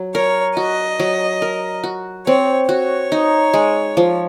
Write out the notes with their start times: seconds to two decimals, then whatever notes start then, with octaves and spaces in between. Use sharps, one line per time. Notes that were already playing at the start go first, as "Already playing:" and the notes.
Already playing: F#3
0.14 A#4 C#5
0.57 F#4 D#5
1.00 F#3
1.42 A#4
1.84 F#4
2.27 C4 C#5
2.69 F#4 C#5
3.12 D#4
3.54 G#3
3.97 F3